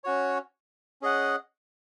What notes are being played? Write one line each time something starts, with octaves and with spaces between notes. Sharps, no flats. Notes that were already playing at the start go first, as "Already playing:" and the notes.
C#4 F#4 C#5
C#4 G#4 D#5 F#5